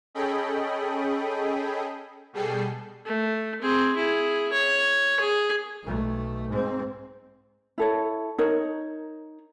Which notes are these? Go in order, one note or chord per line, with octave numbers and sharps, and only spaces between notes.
C#4 G#4 A4 D#5 G5 B5
B2 G3 G#4 A4 G5 C7
A3
C4 G#4
E4 G#4
C#5
G#4
B1 A3
G#2 C4
E4 A4 C#5
D#4 A#4 C#5